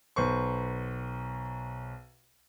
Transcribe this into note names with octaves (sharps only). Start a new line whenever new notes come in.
B1 B4 C5 C#6